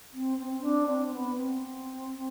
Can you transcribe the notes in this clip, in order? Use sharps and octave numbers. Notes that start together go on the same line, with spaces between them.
C4
C4
D4
C4
B3
C4